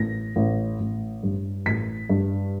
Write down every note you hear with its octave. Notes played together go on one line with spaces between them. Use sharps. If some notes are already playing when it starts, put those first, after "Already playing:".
Already playing: A1 A#6
A1
A1
G2
A1 B6
G2